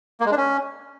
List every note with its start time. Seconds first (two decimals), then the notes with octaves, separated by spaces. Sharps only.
0.20 A#3
0.26 G#3
0.32 D4
0.37 C#4